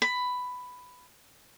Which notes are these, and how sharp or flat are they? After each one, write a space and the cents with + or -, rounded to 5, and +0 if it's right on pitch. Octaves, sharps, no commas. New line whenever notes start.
B5 +10